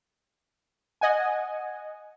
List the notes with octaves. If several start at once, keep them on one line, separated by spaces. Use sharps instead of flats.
D#5 F#5 G#5